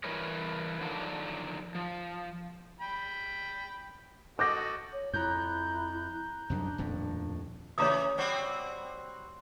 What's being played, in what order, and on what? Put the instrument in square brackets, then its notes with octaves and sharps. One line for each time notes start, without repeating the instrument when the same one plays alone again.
[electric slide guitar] E3 G3 A#4 B4 C#5
D3 D#3 F3 F#3 D4
F3
[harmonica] G5 B5
[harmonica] F#4 A4 D#5 [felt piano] D6 G6 A#6
[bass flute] C#5
[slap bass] F2 [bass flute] E4 [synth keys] A#5 F#6 G6
[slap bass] C2 F#2 D#3 [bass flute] D4
[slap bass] D#1 F2 A2
[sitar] C#3 E3 [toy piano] C#5 A#5 D#6
[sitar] G3 C4 F#4